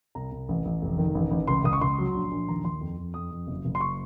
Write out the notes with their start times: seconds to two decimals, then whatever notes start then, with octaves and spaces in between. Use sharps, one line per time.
0.15 C2 A#5
0.32 C2
0.48 A1
0.65 A1
0.82 F1
0.98 D#3
1.15 A1
1.31 A1
1.47 C#2 C6
1.64 C#2 D#6
1.73 C#6
1.81 C#2 C6
1.99 F#3
2.15 A#1
2.31 A#1
2.48 D#2 A#5
2.64 D#2 C6
2.81 F2
2.97 F2
3.14 F2 D#6
3.31 F2
3.47 F#1
3.65 F#1
3.75 C6
3.81 C#6